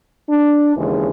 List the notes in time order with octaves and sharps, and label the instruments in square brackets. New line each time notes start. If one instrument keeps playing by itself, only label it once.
[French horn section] D4
D#2 C#3 E3 G#3 D4